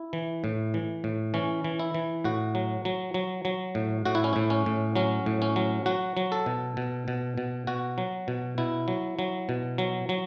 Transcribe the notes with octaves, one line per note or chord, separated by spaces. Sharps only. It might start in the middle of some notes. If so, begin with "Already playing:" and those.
Already playing: E4
E3
A2
E3
A2
E3 C#4
E3
E4
E3
A2 F#4
F#3
F#3
F#3
F#3
A2
A2 F#4
E4
C#4
A2 E4
C#4
A2
F#3 C#4
A2
C#4
F#3
F#3 F#4
F#3
A4
B2
B2
B2
B2
B2 F#4
F#3
B2
B2 E4
F#3
F#3
B2
F#3
F#3